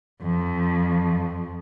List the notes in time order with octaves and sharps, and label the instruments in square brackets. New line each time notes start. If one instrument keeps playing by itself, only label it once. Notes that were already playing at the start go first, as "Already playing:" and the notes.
[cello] F2 F3